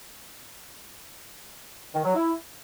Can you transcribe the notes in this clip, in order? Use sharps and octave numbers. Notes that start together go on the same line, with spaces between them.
D#3
F#3
E4